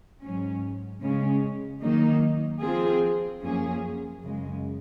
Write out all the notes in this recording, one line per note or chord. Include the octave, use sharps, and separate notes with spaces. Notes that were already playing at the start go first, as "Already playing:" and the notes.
G#2 F#3 C#4
C#3 G#3 C#4
D#3 F#3 A#3 D#4
F3 C4 F4 G#4
F#2 F3 A#3 C#4 G#4
F#2 C#3 G#3